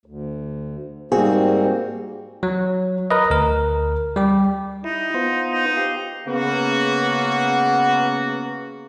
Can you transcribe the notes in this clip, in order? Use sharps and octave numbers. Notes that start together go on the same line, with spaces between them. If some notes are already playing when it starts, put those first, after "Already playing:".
D2
G#2 G3 A#3 C4 F#4 G#4
F#3
A#4 B4 D#5
D2 A#4
G3 G4
D#4 E4
B3 F4 C5
D#4
G4 F5
C#3 A#3 B3 F#4